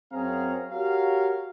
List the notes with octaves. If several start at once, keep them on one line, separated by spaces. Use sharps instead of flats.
F#2 C4 G#4 C#5 F5 A#5
F#4 G4 A#4 C#5 F5